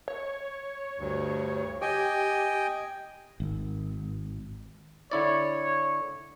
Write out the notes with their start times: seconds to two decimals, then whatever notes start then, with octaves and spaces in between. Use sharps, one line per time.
0.08 C#5
0.98 D2 G2
1.82 G4 D#5 G5 G#5
3.40 G#1
5.11 D3 E4 C#5 D5